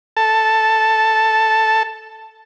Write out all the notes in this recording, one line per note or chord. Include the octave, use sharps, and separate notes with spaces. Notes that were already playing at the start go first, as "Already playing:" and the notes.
A4 A5